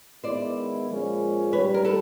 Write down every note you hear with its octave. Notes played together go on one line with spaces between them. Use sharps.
D#3 G#3 B3 E4 C5 D5
A#2 F3 G#3 C#4 F4
G2 D#3 G3 B4 C#5
A#4
A4 B4